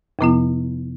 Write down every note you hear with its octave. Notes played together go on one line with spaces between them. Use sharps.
F2 C3 F3 B3 E4